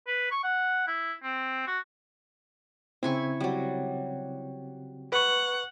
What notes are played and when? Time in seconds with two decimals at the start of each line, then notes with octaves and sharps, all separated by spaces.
0.07 B4
0.31 C#6
0.44 F#5
0.87 E4
1.23 C4
1.67 F#4
3.03 C#3 C4 E4 G#5 C#6
3.40 F#3 G3
5.12 B4 F#5 C#6